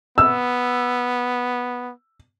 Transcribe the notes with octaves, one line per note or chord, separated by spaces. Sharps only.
B3 E6